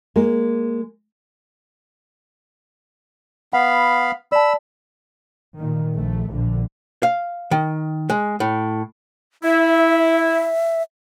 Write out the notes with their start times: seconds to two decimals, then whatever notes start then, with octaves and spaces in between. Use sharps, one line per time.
0.16 G#3 A#3
3.53 B3 F5 F#5 B5
4.32 D5 A5 B5 E6
5.58 A#2 D#3
5.96 A#1 A3
6.33 A#1 D3
7.03 F5
7.51 D#3
8.10 G#3
8.40 A2
9.44 E4 E5